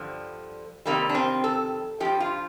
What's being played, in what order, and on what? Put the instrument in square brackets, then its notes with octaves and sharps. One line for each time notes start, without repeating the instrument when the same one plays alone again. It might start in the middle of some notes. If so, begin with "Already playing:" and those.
Already playing: [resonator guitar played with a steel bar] G2 D3 F3
F2 C3 D#3 G3 A#3
D4
C4
A4
G2 F3 G4
F4